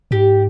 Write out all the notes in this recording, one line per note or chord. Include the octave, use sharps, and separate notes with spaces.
G#2 G4